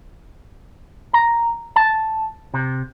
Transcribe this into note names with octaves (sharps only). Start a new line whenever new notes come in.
A#5
A5
C3